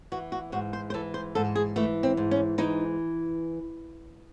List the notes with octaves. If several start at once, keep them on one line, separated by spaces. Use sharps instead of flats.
E3 F#4
F#4
G#2 F#4
C5
C5
E3 A4
C5
G#2 A4
G#4
E3 A3
C4
G#2
C#4
E3 D#4